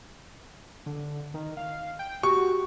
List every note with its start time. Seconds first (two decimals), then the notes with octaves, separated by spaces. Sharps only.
0.86 D3
1.34 D#3
1.57 F5
1.99 G5
2.23 F#4 G4 C#6